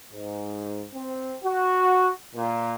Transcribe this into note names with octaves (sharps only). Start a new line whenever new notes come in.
G#2
C4
F#4
A#2